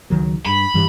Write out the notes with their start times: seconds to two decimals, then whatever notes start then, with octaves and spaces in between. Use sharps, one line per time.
0.10 C#2 D#3 F#3
0.46 G2 B5
0.74 G2 E3 G3